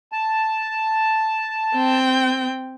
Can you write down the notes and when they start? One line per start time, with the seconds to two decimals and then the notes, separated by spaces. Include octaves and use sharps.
0.12 A5
1.75 C4 G5